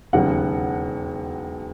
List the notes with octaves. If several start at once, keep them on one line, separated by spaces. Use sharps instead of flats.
E1 D#2 C#3 F#3 F#5